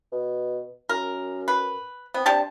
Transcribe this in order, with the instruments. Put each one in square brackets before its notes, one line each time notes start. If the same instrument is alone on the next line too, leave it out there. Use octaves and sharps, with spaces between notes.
[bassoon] B2
[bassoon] F#2 [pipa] A#4
[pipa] B4
[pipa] B3 [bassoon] C4
[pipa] C3 G4 A5 [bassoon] D4